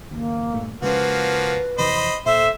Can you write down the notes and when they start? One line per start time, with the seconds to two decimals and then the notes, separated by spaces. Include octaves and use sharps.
0.11 F#1 D#2 A#3
0.53 G2 A#2 A3
0.82 C#3 F3 G#3 A#3 C#4 F#4 B4
1.78 F2 C3 E3 C5 D#5 B5
2.26 A#2 A4 C5 E5